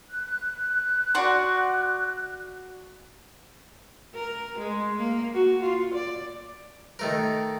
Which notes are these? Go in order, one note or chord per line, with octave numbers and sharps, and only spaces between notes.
F#6
F#4 D5 C6
A#4
G#3
A#3
F#4
F4
D5
D#3 A3 A#4